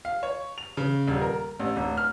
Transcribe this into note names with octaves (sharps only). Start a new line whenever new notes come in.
F5
C#5
F7
C#3
D#1
A#4
A1
D1
F6